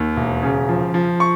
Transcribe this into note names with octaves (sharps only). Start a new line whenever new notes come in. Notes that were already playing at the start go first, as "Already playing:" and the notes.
Already playing: D#2
E1
C#3
F3
F3
C#6